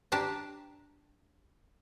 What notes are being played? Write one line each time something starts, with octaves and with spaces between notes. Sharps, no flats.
D4 G4 A5 A#5